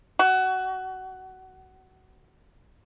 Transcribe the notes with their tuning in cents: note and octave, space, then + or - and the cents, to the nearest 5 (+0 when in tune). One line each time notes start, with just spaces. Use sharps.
F#4 +20